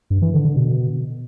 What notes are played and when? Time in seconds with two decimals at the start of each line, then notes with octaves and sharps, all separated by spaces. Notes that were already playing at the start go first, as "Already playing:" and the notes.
0.10 G2
0.22 E3
0.33 D3
0.45 D3
0.56 B2